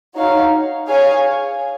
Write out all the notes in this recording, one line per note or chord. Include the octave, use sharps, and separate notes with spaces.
D#4 F#4 C#5 F5
G#4 C#5 F5 G#5